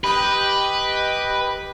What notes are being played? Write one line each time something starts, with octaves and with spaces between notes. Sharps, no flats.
G4 B4 D#5 G5